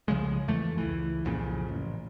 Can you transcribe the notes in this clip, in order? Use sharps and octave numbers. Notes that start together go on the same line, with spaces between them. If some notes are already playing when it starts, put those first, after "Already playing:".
C2 C#3 F3 G#3
F2 E3 A3
C#2 E3
C2 F2 A#2 C#3
A1